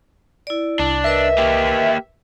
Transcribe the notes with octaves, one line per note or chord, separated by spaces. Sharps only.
E4 D5
C2 D4
A#4 B4 D#5 E5
A#3 G4